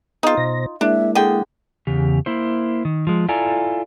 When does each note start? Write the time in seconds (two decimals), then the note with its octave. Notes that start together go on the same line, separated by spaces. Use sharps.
0.23 B3 D#4 F4 G#4
0.37 B2 C5 A#6
0.81 G#3 A#3 D4 E4 E5
1.15 D3 G#4 G5
1.87 E2 C#3 G4
2.26 A#3 E4 C5
2.85 D#3
3.07 F3 G#3
3.28 E4 F4 A4 D5 G#5 A#5